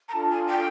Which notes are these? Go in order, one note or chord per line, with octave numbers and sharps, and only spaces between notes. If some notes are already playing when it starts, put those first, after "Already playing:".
A#5
D4 F4 A4 A5
G#5
G5